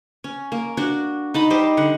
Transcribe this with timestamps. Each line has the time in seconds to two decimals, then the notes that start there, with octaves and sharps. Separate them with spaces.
0.24 C#4
0.52 A#3
0.77 D4 F#4
1.34 D#4 A5 B5
1.50 G3 G4 C5 D#5
1.77 D3 F#5